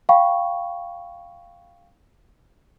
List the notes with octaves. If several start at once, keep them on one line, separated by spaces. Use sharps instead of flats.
F5 G5 B5 C#6